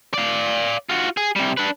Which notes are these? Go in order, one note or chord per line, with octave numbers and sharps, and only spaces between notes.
D5 F5
F4 F#4
G#4
C3 G3
D4 B4